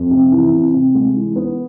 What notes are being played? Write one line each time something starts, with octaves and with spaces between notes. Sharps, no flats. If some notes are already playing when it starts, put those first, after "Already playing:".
Already playing: F2
C3
E3
C3
C3
G#3
E3
B3